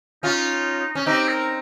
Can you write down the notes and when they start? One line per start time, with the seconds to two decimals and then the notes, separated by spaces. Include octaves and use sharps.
0.23 C#4 D#4 F4
0.95 C#4
1.06 C4 D#4 G4
1.28 A#4